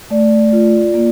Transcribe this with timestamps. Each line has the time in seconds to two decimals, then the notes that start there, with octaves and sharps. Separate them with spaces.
0.10 A3 D5
0.52 F4
0.94 A#3